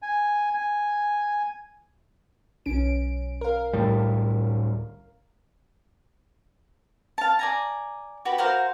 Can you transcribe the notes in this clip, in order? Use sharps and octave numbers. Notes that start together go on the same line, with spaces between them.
G#5
G#5
B1 C#4 D7
A#4 F5
D2 A2 G3
F5 A5
D5 G#5 A#5
F#4 G4 B4
F#4 A#4 C5 F5